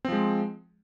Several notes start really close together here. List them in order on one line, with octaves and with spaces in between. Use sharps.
C4 F3 G#3